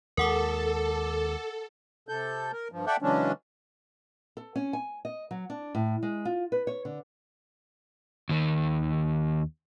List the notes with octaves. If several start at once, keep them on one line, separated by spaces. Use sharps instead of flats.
D#2 G#3 A4 A#4 F#5 D6
C3 A4 G6
A#4
G2 F3
A4 D5 E5 F#5 G5
C#3 E3 F#3 G#3 C#4 D4
A4
C#4
G#5
D#5
F#3
D4
A2
G#3
F4
B4
C#5
D3
D#2 D#3